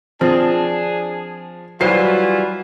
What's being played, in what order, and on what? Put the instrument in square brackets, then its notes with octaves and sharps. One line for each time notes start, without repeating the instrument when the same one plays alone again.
[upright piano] F3 [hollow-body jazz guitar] C4 [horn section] D4 G#4
[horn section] E3 F4 [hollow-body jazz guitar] F#3 G3 C5 [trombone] F#4 [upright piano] C7